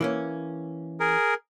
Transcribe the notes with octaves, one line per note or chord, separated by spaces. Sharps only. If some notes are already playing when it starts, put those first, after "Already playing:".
E3 A#3 C#4
G#4 A#4